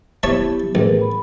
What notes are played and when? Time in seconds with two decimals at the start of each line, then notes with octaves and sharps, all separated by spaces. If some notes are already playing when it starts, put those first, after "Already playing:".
0.23 B3 E4 G4 C#5 E5 A5
0.75 A1 G#4 A#4 B4
1.01 B5